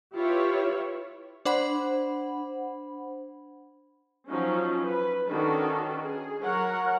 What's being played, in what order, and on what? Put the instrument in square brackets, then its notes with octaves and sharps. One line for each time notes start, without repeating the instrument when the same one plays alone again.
[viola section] E4 F4 G4 B4 C#5
[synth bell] D4 C5 F#5 B5
[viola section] F3 F#3 C#4 D#4
B4
D#3 C#4 D4 F#4 A4 B4
G#4
F#3 A#4 C#5 F#5